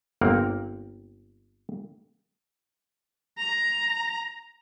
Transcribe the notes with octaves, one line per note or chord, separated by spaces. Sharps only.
G1 A#3 C4 A#4 F#5
A#5